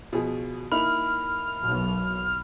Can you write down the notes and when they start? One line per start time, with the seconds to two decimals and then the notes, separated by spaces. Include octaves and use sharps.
0.13 B2 F3 G#4
0.72 A#3 D#4 E4 B5 F6
1.61 B1